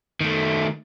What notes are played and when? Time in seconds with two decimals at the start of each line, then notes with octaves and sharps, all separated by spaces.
0.21 D#3 A3